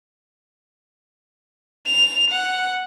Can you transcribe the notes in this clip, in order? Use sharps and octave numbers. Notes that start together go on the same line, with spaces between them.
F7
F#5